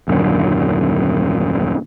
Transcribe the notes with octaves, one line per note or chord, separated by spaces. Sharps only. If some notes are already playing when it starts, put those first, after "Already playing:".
D#1 F#2 D3